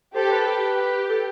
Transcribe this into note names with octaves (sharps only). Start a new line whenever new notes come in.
G4 A4 C5
B4
G4
G4
A4